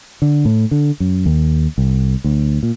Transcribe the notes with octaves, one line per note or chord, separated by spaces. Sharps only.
D3
A2
D3
F#2
D#2
C2
D2
A#2